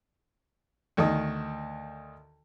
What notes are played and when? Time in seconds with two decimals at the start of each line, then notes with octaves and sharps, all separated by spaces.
0.97 D2 D#3 D#5 D#6